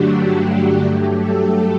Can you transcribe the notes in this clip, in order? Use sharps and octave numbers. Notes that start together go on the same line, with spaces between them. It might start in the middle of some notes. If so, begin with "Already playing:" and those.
Already playing: G2 D3 F#3 A3 D4 F#4 G4
G4
G2 F#3 A3 G4
A4